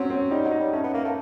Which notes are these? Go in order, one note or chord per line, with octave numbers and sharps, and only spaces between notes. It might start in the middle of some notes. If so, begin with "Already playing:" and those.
Already playing: F#3 C4 C#4
C4
G3 D#4
F#3
D#4
G3
A3 C#4
B3
A#3
A3